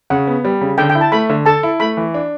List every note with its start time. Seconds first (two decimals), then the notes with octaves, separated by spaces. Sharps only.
0.10 C#3 F#5
0.27 B3
0.45 G3
0.61 C#3
0.78 D3 G5
0.90 G5
0.95 E4
1.01 A5
1.12 A3 B5
1.30 D3
1.46 A4 A5
1.63 E4
1.80 A3 B5
1.97 E3
2.14 D4